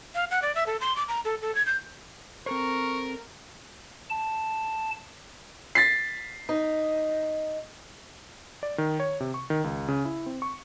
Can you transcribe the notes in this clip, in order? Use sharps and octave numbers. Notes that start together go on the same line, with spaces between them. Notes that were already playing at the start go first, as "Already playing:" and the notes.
F5
F#5
D5
E5
A4
C6
D6
A#5
A4
A4
G#6
G6
C4 A4 A#4 C5 C#6
A5
A6 B6 C7
D#4
D5
D#3
C#5
C3
C#6
D#3
C#2
C#3
E4
C4
C#6